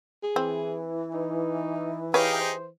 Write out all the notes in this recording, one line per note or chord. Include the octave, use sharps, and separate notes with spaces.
G#4
E3 C4
D#4
D#4 G4 G#4 B4 C#5 F5
C5